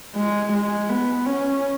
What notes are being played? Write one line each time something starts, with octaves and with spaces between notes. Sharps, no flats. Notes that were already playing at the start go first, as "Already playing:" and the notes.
G#3
G#3
B3
C#4